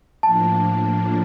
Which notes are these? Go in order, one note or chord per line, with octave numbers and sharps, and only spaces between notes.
A2 F3 A#3 D4 A5